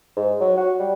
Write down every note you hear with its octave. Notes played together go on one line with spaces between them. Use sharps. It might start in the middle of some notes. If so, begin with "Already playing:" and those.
G#2
F#3
F#4
G3